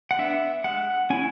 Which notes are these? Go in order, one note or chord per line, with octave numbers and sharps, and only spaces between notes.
F#5
B3 D4 E5
G#3 F#5
C#4 E4 G#5